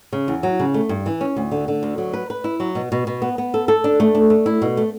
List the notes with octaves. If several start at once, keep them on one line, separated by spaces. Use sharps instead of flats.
C#3
E2
F#3
C#3
A3
G2
E3
C#4
D2
D3
D3
D2
F#3
B4
B4
E4
F#3
B2
B2
B2
B3
B3
A4
A4
D4
A3
D4
A3
E4
B2
A3